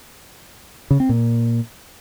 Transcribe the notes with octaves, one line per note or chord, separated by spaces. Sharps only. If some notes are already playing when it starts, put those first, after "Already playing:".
C#3
C4
A#2